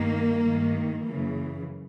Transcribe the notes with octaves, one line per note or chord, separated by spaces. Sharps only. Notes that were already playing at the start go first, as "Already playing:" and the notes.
Already playing: G2 D#3 A#3
G2 D#3
F#2 C#3 E3